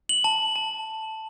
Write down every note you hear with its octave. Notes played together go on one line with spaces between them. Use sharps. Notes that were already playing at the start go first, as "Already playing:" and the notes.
F#7
A5 F#7
A5